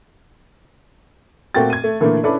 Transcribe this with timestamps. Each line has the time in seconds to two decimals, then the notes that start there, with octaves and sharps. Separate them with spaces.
1.54 A#2 A3 C4 F#4 G5 A6
1.70 G#6 D#7
1.84 A3
2.00 A#2 D3 E3 A3 A#3
2.23 C#4 D4 E4 A4 B4 D5